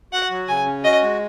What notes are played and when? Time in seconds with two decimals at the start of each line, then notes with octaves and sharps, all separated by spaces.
0.13 F#4 F#5
0.30 F#3
0.48 C#3 G#5
0.66 C#4
0.84 F#4 D#5
1.02 G#3